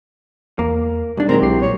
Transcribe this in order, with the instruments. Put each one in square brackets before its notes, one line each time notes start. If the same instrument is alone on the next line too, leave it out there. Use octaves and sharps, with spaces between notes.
[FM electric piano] E2 [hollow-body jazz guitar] A#3
[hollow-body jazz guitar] B1 D4 [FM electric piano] G3
[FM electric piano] A#2 D#3 G#3 [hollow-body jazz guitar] F#3 C4 [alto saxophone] A#4
[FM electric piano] B1 E4 C7 [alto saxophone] G4
[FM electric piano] A#2 F#3 G3 [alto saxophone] C#5